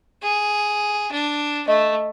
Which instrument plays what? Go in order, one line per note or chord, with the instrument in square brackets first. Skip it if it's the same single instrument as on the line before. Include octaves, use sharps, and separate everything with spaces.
[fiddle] G#4
D4
[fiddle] A3 [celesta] D#5